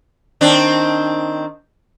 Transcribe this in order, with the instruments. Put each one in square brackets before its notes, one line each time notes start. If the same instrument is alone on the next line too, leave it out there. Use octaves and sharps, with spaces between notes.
[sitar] D#3 C4 D4